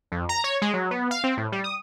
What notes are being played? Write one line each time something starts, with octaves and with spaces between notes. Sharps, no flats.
F2
A#5
C#5
G#3
F#3
B3
F5
C4
A2
G3
D#6